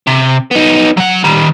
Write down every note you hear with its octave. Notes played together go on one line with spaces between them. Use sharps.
C3
B3 D#4
F#3 F#5
D#3 G3